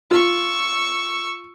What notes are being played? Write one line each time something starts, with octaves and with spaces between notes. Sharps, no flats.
F4 C#6 E6